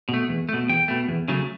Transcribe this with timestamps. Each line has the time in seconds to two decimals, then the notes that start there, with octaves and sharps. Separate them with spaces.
0.09 B2 A3
0.29 E2
0.49 B2 A3
0.69 E2 G5
0.88 B2 A3
1.08 E2
1.28 C#3 F#3 A3